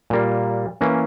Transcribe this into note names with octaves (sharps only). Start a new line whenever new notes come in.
A#2 G3 A#3
E3 A#3 C#4